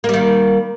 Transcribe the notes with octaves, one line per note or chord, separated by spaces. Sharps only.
D#3 G3 A#3